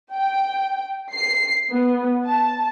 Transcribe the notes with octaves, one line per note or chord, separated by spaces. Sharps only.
G5
C7
B3
A5